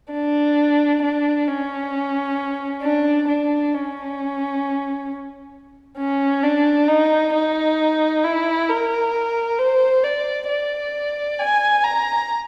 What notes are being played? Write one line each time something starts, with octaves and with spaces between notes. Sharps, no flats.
D4
D4
C#4
D4
D4
C#4
C#4
D4
D#4
D#4
E4
A#4
C5
D5
D5
G#5
A#5